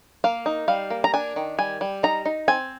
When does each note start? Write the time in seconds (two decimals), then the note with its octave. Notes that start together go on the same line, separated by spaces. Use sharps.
0.24 A#3 F5
0.46 D#4
0.68 G3 F5
0.90 A#3
1.04 A#5
1.14 D4 G#5
1.36 D#3
1.58 G3 G#5
1.81 G3
2.03 D#4 A#5
2.25 D#4
2.48 C4 G#5